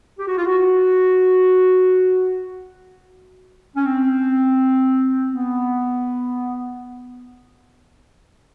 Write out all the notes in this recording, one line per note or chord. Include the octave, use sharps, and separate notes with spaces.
G4
F#4
F4
F#4
C#4
C4
B3